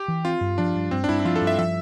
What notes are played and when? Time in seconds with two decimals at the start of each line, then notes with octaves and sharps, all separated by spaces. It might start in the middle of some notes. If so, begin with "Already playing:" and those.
Already playing: G4
0.08 E3
0.25 C4 F4
0.41 G2
0.58 F3 D4
0.75 G2
0.91 G2 C4
1.04 D4
1.09 G2 E4
1.20 E4
1.25 F3 F4
1.36 A4
1.41 G2
1.47 E5
1.58 F3 E5